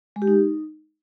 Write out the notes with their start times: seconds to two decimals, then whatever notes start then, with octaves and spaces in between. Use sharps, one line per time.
0.16 G#3
0.22 G4
0.28 D#4